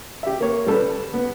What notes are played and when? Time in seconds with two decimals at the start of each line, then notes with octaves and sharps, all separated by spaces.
0.23 G4 E5
0.40 A#3 C#5
0.66 G3 A4 B4
1.13 B3